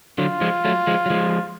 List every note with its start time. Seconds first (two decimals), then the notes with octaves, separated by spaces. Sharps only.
0.18 D3 F#3 F4
0.41 F3 G#3
0.65 F#3 A3
0.87 F3 G#3
1.06 F#3
1.10 F3 G#3